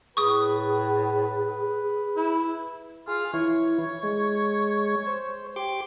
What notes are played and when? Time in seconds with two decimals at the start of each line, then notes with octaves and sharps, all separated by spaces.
0.17 A2 G#4 B4 C#6 D#6
2.17 E4
3.08 F4 G#4
3.34 E3 E4 C#5
4.03 G#3
5.07 C5
5.56 G4 C6 D6